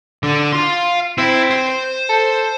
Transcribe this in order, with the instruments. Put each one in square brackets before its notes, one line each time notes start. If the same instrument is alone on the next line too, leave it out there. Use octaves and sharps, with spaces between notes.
[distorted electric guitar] D3
F5 C6
[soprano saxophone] C4 [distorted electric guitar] E4
[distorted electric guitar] C5
[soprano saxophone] A4